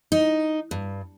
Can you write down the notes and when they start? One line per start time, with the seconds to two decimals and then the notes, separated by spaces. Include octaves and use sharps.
0.12 D#4
0.71 G2